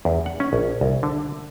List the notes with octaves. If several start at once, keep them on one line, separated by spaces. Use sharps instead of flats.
E2
F#5
C#4
A#1
C2
D3